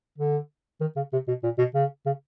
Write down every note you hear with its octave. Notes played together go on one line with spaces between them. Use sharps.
D3
D#3
C#3
C3
B2
A#2
B2
C#3
C#3